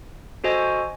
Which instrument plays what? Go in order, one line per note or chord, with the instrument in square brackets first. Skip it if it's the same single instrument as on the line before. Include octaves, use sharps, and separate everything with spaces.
[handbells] F#4 A4 C5 D#5 G#5